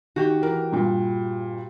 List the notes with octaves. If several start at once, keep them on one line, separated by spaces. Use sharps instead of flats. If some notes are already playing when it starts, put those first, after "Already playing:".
D#3 F#4 G4 G5
E3 A#4
G2 A#2